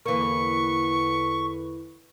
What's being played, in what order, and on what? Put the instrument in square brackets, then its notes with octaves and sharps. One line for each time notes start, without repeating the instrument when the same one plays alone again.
[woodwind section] E2 D3 B4 [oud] E3 A#3 [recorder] C#6